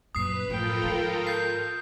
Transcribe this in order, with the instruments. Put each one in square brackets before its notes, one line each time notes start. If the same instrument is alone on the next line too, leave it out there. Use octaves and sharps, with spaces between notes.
[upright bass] F#2 A#2 [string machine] B4 [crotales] D#6 C7
[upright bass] F#2 A2 [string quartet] F3 G5 B5 [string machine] F4 A4 A#4
[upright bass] G#2 D#3
[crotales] G6 C7